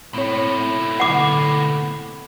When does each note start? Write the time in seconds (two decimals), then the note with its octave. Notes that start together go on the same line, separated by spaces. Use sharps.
0.14 B2 A3 C4 E4 C#5
1.00 D3 F#5 D6